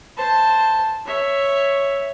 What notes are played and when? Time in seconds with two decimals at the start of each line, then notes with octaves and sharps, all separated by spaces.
0.17 C5 A5
1.06 C#5 E5